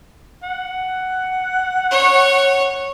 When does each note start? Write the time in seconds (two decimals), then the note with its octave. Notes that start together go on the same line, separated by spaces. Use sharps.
0.43 F#5
1.91 C#5